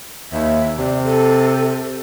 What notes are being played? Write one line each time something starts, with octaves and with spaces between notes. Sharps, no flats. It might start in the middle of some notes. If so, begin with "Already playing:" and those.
D#2 E5
C3 D5
A4